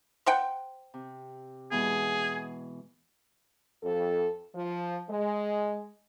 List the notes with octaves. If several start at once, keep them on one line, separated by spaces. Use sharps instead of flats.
C5 F#5 G5
C3
B2 E3 G#3 G#4
F2 A4
F3
G#3